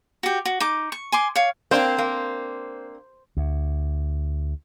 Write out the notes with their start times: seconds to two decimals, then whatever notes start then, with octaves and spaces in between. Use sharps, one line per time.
0.23 F#4 G4
0.45 F#4
0.60 D#4 D6
0.92 C#6
1.12 G#5 C6 D6
1.36 C#5 F5
1.71 A#3 C4 D4 C5 G5
1.98 A#3
3.37 D2